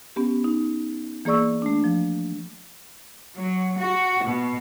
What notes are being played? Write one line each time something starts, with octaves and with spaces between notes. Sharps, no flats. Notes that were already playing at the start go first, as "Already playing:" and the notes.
B3 C#4 G4
D#4
E3 A#3 G#4 D5 C#6 E6
A3 D4
F3
F#3
F#4
B2